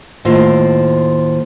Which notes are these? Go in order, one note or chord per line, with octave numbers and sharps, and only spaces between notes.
D#2 A2 F4 C5